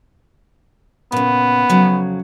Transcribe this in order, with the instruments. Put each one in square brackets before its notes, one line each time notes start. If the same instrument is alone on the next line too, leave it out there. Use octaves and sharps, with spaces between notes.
[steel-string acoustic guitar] A#2 C#3 [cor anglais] B3
[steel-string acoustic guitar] F2 C#3 F#3